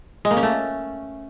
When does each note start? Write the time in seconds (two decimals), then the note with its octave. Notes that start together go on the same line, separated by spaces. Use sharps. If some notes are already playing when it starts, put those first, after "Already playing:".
0.25 G#3
0.31 A#3
0.37 C#4
0.43 A3